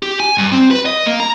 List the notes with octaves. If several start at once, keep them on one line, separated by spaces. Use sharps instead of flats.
G4
G#5
G2
C4
B4
D#5
A#3
A#5